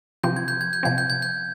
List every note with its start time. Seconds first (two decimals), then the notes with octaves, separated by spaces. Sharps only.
0.24 C3 F3 C4 G6
0.36 G#6
0.48 G6
0.61 G#6
0.73 G6
0.83 C3 F3 C4 G#6
0.98 G6
1.10 G#6
1.22 G6